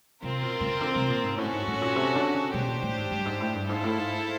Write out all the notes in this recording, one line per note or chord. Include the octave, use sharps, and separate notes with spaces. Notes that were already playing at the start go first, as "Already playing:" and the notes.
C3 C4 F4 A#4
B2
C#3
D3
C3
A#2
G#2
A2 C#4 F#4 A4
G#2
A2
A#2
C3
D3
C#3
B2 D4 G4 C5
A#2
A2
G#2
G2
G#2
A2
G2
G#2 E4 A4 C5 F5
A2
G#2